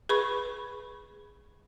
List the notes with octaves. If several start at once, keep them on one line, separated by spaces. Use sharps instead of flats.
G#4 B4 B5 C#6